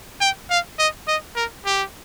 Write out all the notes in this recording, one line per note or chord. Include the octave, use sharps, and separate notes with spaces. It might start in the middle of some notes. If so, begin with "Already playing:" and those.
G5
F5
D#5
D#5
A#4
G4